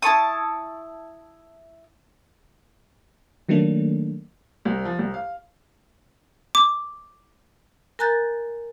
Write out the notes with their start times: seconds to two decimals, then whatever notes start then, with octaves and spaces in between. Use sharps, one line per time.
0.02 E4 A5 C#6 D#6
3.49 D#3 F#3 A3 A#3 D4
4.65 C2
4.85 F3
4.99 C2
5.14 F5
6.55 D6
7.99 A#4 G#5 A#5 F#6 G6 A6